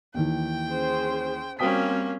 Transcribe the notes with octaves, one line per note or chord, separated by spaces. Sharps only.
D#2 D#3 E3 G5
C#4 G#4 C5
G3 A#3 C4 C#4 F#4 G5 D#6 B6